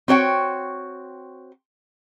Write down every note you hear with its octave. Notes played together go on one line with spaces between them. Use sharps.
C4 F#4 C#5 G5